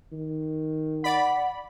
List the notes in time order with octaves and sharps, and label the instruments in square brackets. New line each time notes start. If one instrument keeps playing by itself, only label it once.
[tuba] D#3
[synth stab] D5 B5 [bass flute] F#5